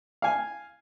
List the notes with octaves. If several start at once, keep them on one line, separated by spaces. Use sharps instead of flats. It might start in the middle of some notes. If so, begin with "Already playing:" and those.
F5 G#5